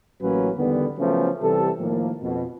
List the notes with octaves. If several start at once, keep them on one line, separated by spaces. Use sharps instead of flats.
A1 A2 F#3 A#3 C#4 B4
E2 D3 D#3 G3 B3
C#3 F3 F#3 A3 B3 C#4
C3 E3 G3 A4
A2 D#3 F3 A#3
F2 B2